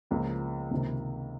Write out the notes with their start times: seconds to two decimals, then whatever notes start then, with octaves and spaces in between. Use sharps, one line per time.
0.11 C#2 C#3 F3 A#3
0.71 C#2 C3 D#3 A#3